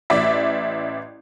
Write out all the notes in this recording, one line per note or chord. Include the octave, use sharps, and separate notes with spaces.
A1 D5 E5